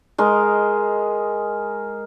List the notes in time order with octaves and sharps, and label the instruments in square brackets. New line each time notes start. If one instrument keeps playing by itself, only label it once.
[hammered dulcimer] G#3 A#4 D#5